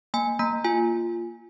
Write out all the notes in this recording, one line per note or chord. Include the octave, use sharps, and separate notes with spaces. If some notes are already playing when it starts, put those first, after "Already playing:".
A#3 G#5
A#3 A#5
F4 G#5